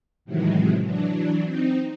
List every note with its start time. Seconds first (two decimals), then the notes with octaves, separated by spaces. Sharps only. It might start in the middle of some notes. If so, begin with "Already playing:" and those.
0.25 A2 C3 D#3 E3 F#3 G#3
0.84 E3 F#3 D4
1.44 C4 D#4